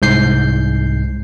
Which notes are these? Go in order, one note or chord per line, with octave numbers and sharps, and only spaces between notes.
C2 G#2 G6 C7